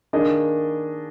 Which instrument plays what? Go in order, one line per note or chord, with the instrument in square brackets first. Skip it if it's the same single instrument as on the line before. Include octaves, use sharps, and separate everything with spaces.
[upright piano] D#3 A#3 D4 G#4 D#5